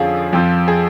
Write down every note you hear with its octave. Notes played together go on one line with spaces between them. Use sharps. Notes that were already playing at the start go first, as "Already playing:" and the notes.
Already playing: F2 D3 F3 C#4 F4 G#4
F2 F3
G#4